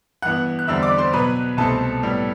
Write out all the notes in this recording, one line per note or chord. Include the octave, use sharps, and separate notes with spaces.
G2 E3 B3 F#5 F#6
F#6
E2 D3 G3 C4 E5 E6
D5 D6
C5 C6
B2 F#3 B3 B4 B5
C2 B2 A3 C4 A4 A5
A2 G3 B3